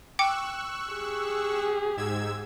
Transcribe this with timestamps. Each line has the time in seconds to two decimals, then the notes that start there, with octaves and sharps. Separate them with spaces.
0.19 G5 C#6 D6 E6 F#6 C#7
0.92 G4 G#4
1.97 G#2 E6 G#6